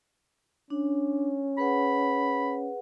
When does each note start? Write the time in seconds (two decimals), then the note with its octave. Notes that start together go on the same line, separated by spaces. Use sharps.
0.70 C#4 D4
1.58 G#4 B4 F#5 B5